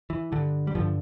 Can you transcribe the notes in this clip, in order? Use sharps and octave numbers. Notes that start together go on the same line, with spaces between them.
E3
G2 D3
G3
G2 D3 F3